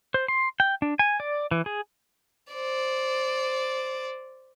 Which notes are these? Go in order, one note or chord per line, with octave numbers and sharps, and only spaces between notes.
C5
C6
G5
D4
G#5
D5
E3
G#4
C5 D5